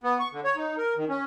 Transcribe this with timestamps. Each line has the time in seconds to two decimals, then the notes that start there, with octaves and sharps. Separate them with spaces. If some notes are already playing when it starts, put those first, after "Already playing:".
0.04 B3
0.20 C#6
0.32 D3
0.44 C#5
0.56 D#4
0.78 A#4
0.97 D#3
1.09 C#4